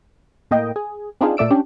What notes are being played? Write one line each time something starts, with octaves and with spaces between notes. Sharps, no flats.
A2 A#3 D#5 G5
G#4
C4 D4 D#4 F4 G#4
A#2 A3 D5 E6 D7
C#4 D4 G4